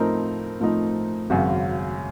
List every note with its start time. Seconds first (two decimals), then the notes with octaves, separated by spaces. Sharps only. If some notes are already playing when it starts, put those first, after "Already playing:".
Already playing: A2 F3 A3 C4 D#4 A#4
0.60 A2 F3 A3 C4 D#4
1.30 G#1 F#2 C#3 F#4